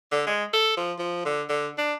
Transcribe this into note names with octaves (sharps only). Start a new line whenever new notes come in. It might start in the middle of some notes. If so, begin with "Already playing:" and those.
D3
G#3
A4
F3
F3
D3
D3
D4